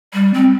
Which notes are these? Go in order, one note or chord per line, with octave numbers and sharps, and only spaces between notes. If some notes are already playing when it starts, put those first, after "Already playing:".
G3
C4